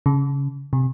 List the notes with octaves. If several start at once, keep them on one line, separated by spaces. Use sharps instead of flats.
C#3
C3